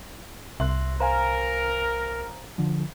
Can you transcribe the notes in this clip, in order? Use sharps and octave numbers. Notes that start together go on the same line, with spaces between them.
C2 E5 C6 F#6
A#4 C5 F5 G#5 A#5
D3 F3